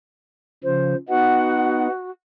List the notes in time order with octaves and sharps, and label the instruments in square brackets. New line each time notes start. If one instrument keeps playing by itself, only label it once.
[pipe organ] C#3 F3 [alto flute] C5
[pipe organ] B3 D#4 [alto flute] F#4 [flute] F#5